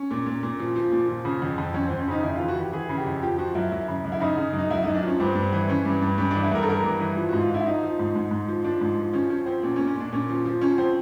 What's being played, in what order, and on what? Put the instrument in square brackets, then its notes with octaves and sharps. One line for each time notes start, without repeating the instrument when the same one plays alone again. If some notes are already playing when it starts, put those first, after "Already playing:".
Already playing: [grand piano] C#4
A#2
A#2
A#2
F3
F3
A#2
F3
C#3
F2
F2
F2 C#4
C4
F2
C#4
C#3 D#4
F2 E4
F4
E3
F#4
E3 G4
E3 G#4
C#3
G4
F2
F3 G4
F3 F#4
F#2 E4
F#2
C#3
F#2
E4
C#3 D#4
C#3
F#2
D#4
F#2 E4
F#2 D#4
D4
F3 C#4
G2 C4
G2
E3
E3 C#4
G2
G2
G2 C#4
D4
E3
E4
G2 A#4
A4
E3 A#4
G2
E3
F3
F#4
G#2
F4
F3 E4
E4
F3 D#4
F3
G#2
G#2
G#2
F3
F3 D4
G#2
F3
F3 C#4
F3 C#4
F3 C4
A#2 C#4
C#4
A#2
C#4
A#2 D4
A#2 C#4
F3
F3
F3 C#4
F3 C4